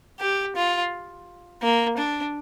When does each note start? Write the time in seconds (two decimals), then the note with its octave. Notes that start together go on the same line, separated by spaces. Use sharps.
0.20 G4
0.55 F4
1.62 A#3
1.97 D4